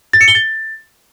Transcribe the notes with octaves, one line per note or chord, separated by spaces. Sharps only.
A6
C#7
G7
A6